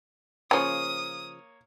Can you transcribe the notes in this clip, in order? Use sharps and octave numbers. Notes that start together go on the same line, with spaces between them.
C#3 F3 A#3 C#5 D#6